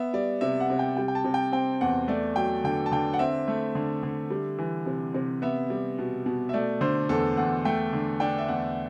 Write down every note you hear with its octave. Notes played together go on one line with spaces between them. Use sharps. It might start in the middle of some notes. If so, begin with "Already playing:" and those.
Already playing: B3 E5
G3 D5
C3 E5
F#5
C3
G5
G3 G5
G5
A5
C3
G5
C4 G5
E2 F#5
A3 D5
F#3 G5
D3 G5
A5
D3 G5
F#5
C4 E5
A3
D3
D3
G3
E3
C3
C3
B3 E5
G3
B2
B2
E5
A3 D5
D3 C5
E2 A4
E2 F#5
A3 G5
D3
D4 G5
E5
E2 F#5